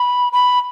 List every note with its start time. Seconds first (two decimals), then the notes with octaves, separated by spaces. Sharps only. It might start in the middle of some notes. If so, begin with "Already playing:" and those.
Already playing: B5
0.33 B5